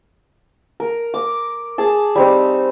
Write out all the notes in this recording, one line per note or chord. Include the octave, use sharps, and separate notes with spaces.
A#4
D6
G#4 A5
G3 C4 D#4